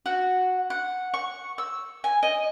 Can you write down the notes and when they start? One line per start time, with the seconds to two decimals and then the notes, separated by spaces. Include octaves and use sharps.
0.06 F#4
0.70 F#5
1.14 C#6
1.58 E6
2.04 G#5
2.23 D#5